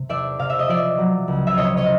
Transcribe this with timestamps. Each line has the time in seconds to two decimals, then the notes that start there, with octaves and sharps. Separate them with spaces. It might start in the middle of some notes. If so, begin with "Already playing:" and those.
Already playing: C3
0.09 E2 D5 E5
0.39 C3 F5
0.50 E5
0.59 D#5
0.69 F3 D5 E5
0.98 F#3
1.28 C#2
1.47 E5
1.57 C3 C#5 D#5
1.77 C#5 D#5